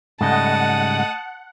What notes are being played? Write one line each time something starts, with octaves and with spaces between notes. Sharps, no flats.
G#2 C#3 G3 A3 D#5 F#5 A5 D#6